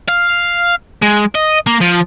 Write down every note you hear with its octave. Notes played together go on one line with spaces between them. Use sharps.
F5
G#3
D#5
A#3
F3